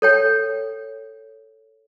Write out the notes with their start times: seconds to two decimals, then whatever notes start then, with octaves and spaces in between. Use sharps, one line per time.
0.02 A4 C#5 G5